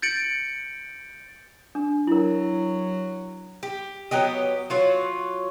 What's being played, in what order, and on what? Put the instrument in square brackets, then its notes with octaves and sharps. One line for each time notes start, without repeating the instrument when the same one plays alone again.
[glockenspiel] G6 A6 C#7 D7 F#7
[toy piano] D4
[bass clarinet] F#3 [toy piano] E4 A#4
[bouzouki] G4
F#3 B3 G4 D#5
F#3 F4 F#4